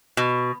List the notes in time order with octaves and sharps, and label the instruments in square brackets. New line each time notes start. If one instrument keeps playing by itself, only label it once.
[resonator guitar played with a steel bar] B2